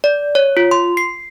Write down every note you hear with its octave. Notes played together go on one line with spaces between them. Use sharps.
D5
C#5
F4
C6
C7